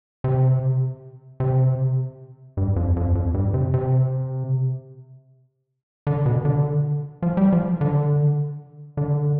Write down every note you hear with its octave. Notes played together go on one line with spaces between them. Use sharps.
C3
C3
G2
F2
F2
F2
G2
C3
C3
D3
B2
D3
F3
G3
F3
D3
D3